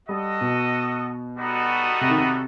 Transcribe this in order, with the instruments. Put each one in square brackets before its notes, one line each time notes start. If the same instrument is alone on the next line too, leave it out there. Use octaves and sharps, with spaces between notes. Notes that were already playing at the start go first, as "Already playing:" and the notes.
[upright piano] G3 [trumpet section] F#4 A4 D#5
[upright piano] B2
[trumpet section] G3 B3 D#4 F#4 A4
[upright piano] C3
D#3
C3